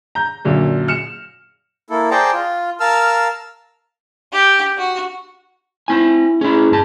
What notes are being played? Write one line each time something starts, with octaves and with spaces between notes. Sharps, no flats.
A#5 G6
F#2 A#2 D3 F#3
F6 C#7 E7
A#3 E4 A4
G#4 C5 D5 G5 A5 A#5
F4
A#4 F5 A5 E6 F6
G4
F#4
C4 E4 G#5
C#4 E4 G#4
G2 A5